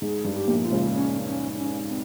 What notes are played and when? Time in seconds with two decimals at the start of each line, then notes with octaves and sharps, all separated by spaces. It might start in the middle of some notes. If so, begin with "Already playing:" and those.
0.01 G#2 G#4
0.24 G2
0.33 G4
0.48 A#1 A#2
0.64 F4
0.71 C#2 C#3
0.95 C#4
1.26 C#4
1.58 C#4
1.89 C4